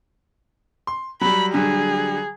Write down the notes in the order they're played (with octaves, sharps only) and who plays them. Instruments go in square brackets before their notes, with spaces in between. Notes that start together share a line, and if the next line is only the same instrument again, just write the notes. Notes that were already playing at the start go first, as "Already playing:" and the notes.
[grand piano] C6
[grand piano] F#3 G3 [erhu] B5
[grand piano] D3 F#3 G3 [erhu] G#4